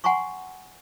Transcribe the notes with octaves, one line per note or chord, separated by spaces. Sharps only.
F#5 G#5 A#5 C6 C#6